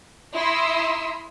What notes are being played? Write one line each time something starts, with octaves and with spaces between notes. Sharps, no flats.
E4 E5 A#5 C6 D#6 E6